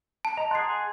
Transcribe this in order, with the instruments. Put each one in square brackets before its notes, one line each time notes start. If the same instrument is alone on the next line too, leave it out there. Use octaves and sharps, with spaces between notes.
[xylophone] A5
[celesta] D#5 [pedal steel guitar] A#5
[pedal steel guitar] G#4 F#5 [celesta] C6 A6 C7